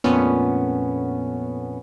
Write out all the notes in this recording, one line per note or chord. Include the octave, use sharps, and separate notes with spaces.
F2 A#2 A3 B3 C#4